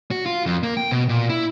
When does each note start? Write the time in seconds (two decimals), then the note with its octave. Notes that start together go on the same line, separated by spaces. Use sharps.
0.11 F#4
0.26 F4
0.46 F2
0.63 A#3
0.77 G5
0.91 B2
1.09 A#2
1.29 E4